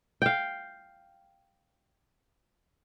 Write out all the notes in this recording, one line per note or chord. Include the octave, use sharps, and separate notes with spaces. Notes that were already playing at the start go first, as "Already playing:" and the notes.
F5 G5